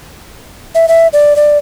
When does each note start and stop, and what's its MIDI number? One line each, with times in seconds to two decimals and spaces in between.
0.75 0.86 76
0.88 1.07 76
1.13 1.36 74
1.36 1.58 74